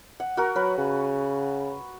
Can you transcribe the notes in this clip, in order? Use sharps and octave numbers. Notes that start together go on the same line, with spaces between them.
F#5
F#4 A#4
F#3 B4
C#3